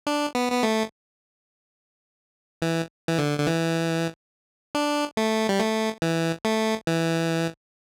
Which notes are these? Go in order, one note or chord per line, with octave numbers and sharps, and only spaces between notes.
D4
B3
B3
A3
E3
E3
D3
D3
E3
D4
A3
G3
A3
E3
A3
E3